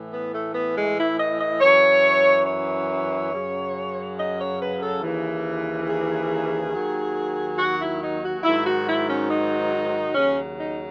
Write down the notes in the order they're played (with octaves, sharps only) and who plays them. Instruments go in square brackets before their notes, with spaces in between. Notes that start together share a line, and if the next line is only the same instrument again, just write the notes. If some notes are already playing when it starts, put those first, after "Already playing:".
Already playing: [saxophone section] A2 E3
B3
A3
B3
G#3
E4
D#5
D#5
F#2 E3 C#5
C#5
F#2 C#3 F#3
D#5
C#5
B4
A4
D#2 C#3 E3
G#4
D#2 D#3 F#3
F#4
E4
D#4
F#4
G#2 D#3 F#3 E4
F#4
E4
C#4
D#4
D#2 C#3 F#3 C#4
D#4